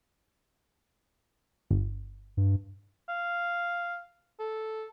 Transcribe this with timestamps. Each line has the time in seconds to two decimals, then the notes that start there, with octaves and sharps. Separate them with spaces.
1.70 G1
2.37 G2
3.09 F5
4.40 A4